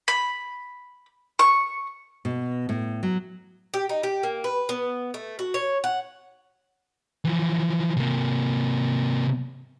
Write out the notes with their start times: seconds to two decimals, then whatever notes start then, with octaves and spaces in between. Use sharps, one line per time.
0.08 B5
1.39 C#6
2.25 B2
2.69 A2
3.03 F#3
3.74 G4
3.89 D#4
4.03 G4
4.23 A#3
4.44 B4
4.69 B3
5.14 A3
5.39 F#4
5.54 C#5
5.84 F#5
7.25 E3 F3
7.97 C3 A#3